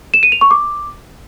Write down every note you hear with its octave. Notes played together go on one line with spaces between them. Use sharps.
E7
D#7
F7
C#6
D6